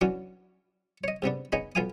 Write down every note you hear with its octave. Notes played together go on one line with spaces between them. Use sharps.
E3 F#3 C#4 D4 F#4
C#5 D#5
G#2 C3 B3 D4
B3 D#4 G#4 C#5 D#5
B1 B3 F4 F5 G#5 D#6